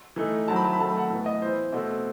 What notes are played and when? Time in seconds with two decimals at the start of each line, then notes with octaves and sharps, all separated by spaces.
0.16 E3 A3 D#4
0.48 D#3 F#3 C4 E4 A5
0.56 B5
0.64 A5
0.73 B5
0.79 D#3 F#3 A3 A5
0.89 B5
0.97 F#5 A5
1.10 A2 E3 B3
1.26 D#5
1.41 E3 B3 E4 C5
1.73 B2 A3 C4